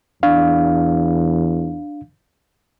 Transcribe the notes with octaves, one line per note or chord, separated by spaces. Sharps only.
E2 D4 F5